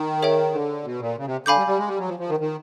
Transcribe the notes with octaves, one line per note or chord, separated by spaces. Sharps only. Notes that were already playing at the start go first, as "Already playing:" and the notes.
Already playing: D#3
G#4 C#5 E5 G5
D3
B2
A#2
C#3
C3
D3 F5 G#5 B5 D6 G6
G3
G3
G#3
G3
F#3
F3
F3
D#3
D#3